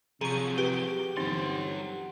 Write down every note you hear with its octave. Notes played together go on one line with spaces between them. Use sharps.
C3 F3 F#3 G#4 A#5 C#6
G4 B4
G1 E3 F#3 C4 D#4 C6